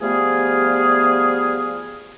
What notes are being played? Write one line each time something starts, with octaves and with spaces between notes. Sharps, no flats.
F3 G3 A3 B3 F4 G#4